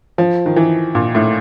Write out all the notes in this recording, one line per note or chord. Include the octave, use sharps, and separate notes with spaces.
F3
D#3
E3
A#2
A2